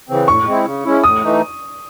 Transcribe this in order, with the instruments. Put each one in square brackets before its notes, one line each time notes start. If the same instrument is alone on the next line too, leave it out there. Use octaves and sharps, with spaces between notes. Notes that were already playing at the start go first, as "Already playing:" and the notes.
[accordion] C#3 E3 C4
[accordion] A2 [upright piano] C#6
[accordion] G#3 C4 E4
C#3
G#3 C#4 E4
[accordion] A2 [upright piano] D#6
[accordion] E3 A3 D#4